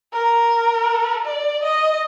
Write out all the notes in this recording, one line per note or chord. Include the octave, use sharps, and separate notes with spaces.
A#4
D5
D#5